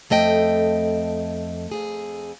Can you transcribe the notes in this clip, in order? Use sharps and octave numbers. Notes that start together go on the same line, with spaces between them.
F2 A3 D#5 G5
F2 G#4